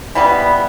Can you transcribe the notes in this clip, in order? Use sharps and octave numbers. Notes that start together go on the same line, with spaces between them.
E3 G3 B3